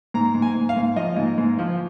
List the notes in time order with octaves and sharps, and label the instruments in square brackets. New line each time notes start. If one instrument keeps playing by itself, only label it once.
[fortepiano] G#2 A#5
G#2
G#5
G#2
F5
G#2
F3 D#5
G#2
G#2
F3